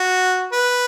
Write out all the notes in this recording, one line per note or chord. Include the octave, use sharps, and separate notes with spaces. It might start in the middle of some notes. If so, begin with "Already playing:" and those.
Already playing: F#4
B4